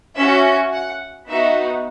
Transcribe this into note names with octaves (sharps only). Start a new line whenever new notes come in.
C#4 F#4 E5
F#5
B3 D#4 F#4 E5